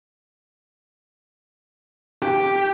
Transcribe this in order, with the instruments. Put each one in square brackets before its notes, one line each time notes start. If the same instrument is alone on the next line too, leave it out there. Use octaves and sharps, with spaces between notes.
[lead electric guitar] G4